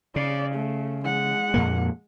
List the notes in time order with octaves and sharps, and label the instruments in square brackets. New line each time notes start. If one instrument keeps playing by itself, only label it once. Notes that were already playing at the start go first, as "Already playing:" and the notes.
[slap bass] C#3 [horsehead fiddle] D5
[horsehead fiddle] A3
G#3 F#5
[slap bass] F2 A#2 A#3